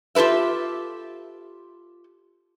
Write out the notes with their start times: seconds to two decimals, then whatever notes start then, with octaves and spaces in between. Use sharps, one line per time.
0.15 F4 G4 A4 B4 E5